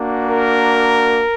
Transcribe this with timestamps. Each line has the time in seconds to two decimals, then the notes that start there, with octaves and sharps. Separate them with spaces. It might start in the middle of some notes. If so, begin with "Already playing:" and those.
Already playing: A#3 D4 F#4
0.26 A#4